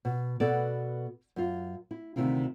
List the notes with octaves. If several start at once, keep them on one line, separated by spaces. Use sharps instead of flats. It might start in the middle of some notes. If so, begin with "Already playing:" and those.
B2
B2 B3 F#4 A4 D5
F#2 F4
E4
D2 C3 D#3 E4 F4